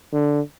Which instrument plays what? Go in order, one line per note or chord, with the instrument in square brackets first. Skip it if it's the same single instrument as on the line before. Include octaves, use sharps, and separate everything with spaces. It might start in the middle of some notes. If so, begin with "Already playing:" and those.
[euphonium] D3